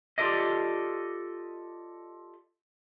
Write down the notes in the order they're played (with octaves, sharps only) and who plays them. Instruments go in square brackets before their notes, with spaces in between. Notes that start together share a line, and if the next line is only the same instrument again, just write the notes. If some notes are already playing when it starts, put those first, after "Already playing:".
[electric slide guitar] F4 G4 A4 D5 D#5